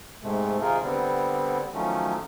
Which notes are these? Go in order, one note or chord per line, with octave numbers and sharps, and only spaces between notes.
G#2 C3 G#3 A3
C3 D#3 D#4 F4 G#4 A#4
D3 G3 B3 C4
D#3 F3 F#3 A3 C#4